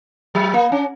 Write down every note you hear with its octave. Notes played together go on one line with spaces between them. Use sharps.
F#3
A#3
C#4